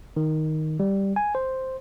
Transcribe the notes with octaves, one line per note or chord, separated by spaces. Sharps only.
D#3
G3
G#5
C5